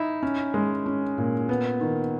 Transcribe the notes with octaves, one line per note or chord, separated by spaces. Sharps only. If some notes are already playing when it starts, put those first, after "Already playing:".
Already playing: D#4 E4
C#4
G#3
C#4
A#2
B3
D#3